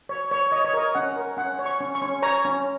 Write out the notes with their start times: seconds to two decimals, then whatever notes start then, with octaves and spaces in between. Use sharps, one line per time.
0.09 C#5
0.31 C#5
0.52 C#5 D#5
0.65 C#5
0.74 A#4 D#5
0.95 C#4 F#5
1.16 A#4
1.37 C#4 F#5
1.59 C#5
1.66 C#6
1.81 C#4
1.95 C#6
2.02 C#4
2.22 C#5 A#5
2.45 C#4